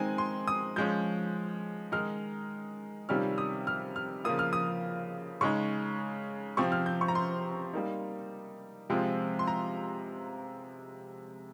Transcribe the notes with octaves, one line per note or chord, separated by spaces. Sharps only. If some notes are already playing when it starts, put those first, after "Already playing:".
Already playing: D#3 G#3 C4 D#4 G#5
C6
D#6
F3 G#3 C#4 G6
D#3 G#3 D#4 F6
C3 D#3 G3 C#4 F4 F6
D#6
F6
F6
C#3 F3 A#3 F4 D#6
F6
D#6
C#3 G#3 D#4 C#6
C3 F3 C4 C#6
F6
G6
C#6
A#5
C6
G3 A#3 D#4
C3 F3 G#3 C4 F4
C6
A#5